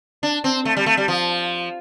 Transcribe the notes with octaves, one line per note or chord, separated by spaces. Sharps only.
D4
C4
A3
G3
A3
G3
F3